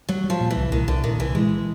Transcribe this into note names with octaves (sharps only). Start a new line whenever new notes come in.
F#3 G3
G3
F3
A#2
E3
C2
C2 D#3
C2 D3
A#2 D#3
C2 E3
E3 G#3